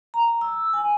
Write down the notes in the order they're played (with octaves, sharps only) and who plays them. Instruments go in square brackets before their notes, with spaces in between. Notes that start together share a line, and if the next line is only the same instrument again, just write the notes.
[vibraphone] A#5
E6
G#5